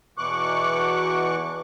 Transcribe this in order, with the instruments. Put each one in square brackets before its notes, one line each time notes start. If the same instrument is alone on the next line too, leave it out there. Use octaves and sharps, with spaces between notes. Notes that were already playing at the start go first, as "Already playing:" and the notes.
[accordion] E2 B2 E3 C#6 D6 F#6